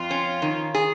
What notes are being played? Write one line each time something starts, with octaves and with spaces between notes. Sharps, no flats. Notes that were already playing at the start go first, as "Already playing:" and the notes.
Already playing: F2 F4
C#4
D#3
G#4